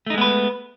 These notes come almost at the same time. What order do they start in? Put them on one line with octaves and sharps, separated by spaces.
A3 D#4 G#3 B3 B4